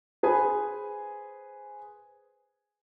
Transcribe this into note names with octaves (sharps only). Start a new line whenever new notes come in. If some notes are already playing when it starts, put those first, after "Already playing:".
G#4 B4 C5 G#5